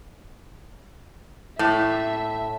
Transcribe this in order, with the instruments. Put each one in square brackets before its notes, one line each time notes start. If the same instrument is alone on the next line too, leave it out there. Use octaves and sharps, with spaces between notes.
[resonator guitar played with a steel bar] A2 [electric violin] E5